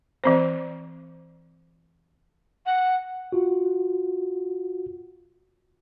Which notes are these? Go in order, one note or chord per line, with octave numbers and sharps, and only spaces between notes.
E3 C4 C5
F#5
F4 F#4